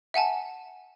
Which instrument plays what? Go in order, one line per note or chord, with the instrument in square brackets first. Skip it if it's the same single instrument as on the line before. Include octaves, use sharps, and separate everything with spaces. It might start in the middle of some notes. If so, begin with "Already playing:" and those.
[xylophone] E5 F#5 G#5 A5